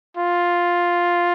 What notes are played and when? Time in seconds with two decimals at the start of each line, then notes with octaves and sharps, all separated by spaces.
0.16 F4